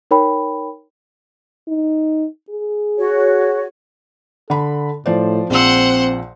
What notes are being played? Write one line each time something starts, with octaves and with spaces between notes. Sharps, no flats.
D#4 A#4 C#5 G5 B5
D#4
G#4
F#4 C#5
D3 A4 B5
A2 F3 C5 D5
A#1 F3 C4 C5 F#5 E6